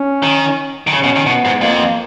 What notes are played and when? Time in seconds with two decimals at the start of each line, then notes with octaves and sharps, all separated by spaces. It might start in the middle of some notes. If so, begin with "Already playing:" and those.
Already playing: C#4
0.23 D#3
0.87 D#3
0.92 C#3 C#4
1.04 B2
1.16 D#3
1.26 B2 B3
1.45 G#2
1.61 F2 A#3